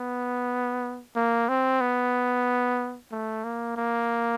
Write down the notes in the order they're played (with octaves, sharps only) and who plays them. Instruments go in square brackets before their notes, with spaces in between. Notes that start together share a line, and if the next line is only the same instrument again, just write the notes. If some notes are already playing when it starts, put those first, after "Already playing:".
Already playing: [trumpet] B3
A#3
C4
B3
A3
A#3
A#3